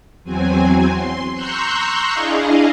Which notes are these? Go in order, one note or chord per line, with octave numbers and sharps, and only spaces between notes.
E2 F#3 C4 G#5
C6
A#5 C6 C#6 E6 F#6 G6
D4 E4 G#4 D#5 F5